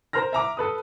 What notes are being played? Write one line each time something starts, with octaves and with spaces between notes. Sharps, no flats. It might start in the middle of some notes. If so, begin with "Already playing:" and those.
A#4 C5 A#5 F6 A#6
E5 A#5 D6
A4 B4 D#6